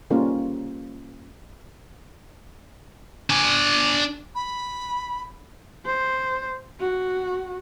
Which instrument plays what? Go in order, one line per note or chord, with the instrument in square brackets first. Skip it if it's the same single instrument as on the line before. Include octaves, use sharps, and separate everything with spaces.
[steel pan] G3 A#3 C#4 F4 A#4
[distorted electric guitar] D4 G#5
[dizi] B5
[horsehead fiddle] C5
F#4